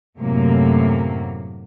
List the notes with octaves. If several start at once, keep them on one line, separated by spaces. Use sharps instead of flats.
F#2 A2 C3 F#3 A#3